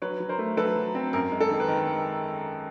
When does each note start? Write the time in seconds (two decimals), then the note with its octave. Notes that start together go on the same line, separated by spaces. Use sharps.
0.02 F#3 B4 C#5
0.20 F#3
0.29 A#4 C5
0.38 A3
0.57 F#3 A4 B4
0.76 F#3
0.95 C4
1.13 F#2 A#4
1.32 G#3
1.41 A4
1.50 D#3
1.60 B4
1.68 D#3 A#4
1.87 G#3